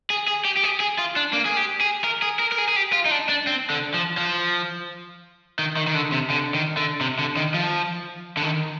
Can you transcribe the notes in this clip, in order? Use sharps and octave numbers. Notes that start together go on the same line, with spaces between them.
G#4
G#4
G4
G4
G#4
G#4
F4
D4
A#3
G#4
G4
G#4
A#4
G#4
A#4
A#4
G#4
G#4
G4
F4
D#4
D4
D4
C4
D3
F3
F3
D#3
D#3
D#3
D3
C3
D3
D#3
D3
C3
D3
D#3
F3
D3
D#3